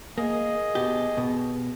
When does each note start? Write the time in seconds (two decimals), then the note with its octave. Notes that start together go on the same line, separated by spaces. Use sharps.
0.18 A#3 G#4 D#5
0.75 B2 G4
1.17 B2